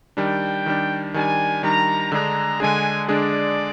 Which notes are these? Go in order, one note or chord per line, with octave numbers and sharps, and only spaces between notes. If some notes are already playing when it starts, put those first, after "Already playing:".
D#3 G3 D4 G5
D#3 G3 D4
D#3 G3 D4 G#5
D#3 G3 D4 A#5
D3 G#3 D4 G#4 A#5
D3 G#3 D4 G#4 G#5
D3 G#3 D4 G#4 D5